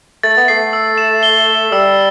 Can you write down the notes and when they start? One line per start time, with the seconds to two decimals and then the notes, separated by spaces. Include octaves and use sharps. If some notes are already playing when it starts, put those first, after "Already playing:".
0.23 A3 A6
0.37 B3
0.48 A3 C7
0.73 E6
0.98 E7
1.23 G7
1.47 G7
1.72 G3 E6